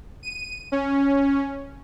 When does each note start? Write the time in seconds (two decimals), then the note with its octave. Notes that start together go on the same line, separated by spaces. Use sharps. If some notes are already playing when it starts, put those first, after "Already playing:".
0.23 D#7
0.72 C#4